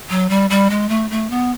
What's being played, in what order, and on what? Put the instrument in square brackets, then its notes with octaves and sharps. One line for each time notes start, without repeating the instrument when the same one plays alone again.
[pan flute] F#3
G3
G3
G#3
A3
A3
B3